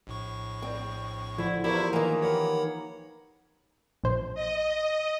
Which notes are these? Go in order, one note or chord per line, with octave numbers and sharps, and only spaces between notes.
A#1 A2 C#6
C4
D3 F3 E4
E2 E4 F4 G4 A4 A#4 C5 C#6
D#3 E3 A#3 A#5
G4 A#4 C#5 F#5 B5
A#1 C5
D#5